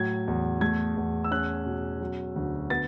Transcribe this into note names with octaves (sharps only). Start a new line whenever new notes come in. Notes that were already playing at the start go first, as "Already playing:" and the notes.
Already playing: A2 F#3 G#6
E2
A3 G#6
E2
E6
C#4 F#6
B2
F#3
D2
B3 A6